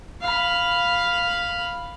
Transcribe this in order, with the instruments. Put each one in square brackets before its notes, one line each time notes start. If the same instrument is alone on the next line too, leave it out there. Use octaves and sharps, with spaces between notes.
[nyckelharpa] F5 B5